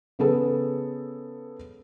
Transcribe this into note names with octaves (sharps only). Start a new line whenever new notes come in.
C#3 B3 G#4 A4